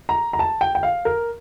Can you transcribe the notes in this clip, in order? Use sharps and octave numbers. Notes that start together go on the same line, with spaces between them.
A#5
A#5
A5
G5
G5
F5
A#4